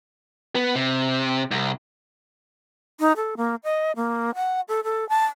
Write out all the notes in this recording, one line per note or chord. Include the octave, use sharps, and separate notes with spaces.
B3
C3
C2
D#4
A4
A#3
D#5
A#3
F#5
A4
A4
A5